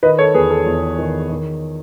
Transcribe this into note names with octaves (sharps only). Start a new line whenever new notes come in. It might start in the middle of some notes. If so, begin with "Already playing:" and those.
D#3 B4 D#5
A4 C#5
E2 G#4 B4
A4
E2
D#3
D#3